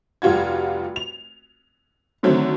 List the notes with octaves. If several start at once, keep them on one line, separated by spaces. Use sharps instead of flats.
F1 G3 F4 F#4 G#6
F7
D3 D#3 F#3 A3 C4